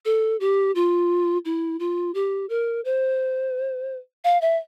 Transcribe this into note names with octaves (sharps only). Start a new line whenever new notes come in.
A4
G4
F4
E4
F4
G4
A#4
C5
F5
E5